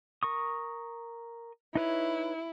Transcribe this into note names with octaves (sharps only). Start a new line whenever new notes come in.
A#4 C#6 D#6
D#4 E4 B4 C#5